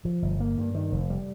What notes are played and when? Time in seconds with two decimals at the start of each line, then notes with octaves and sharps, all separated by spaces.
0.05 F3
0.22 G1
0.40 A#3
0.58 G2
0.75 D#3
0.92 F1
1.10 G3